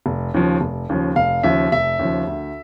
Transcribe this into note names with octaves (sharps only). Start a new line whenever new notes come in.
F1
D#2 C#3 F3
F1
D#2 C#3 F3
F1 F5
D#2 C#3 F3 E5
F1 E5
D#2 C#3 F3
D2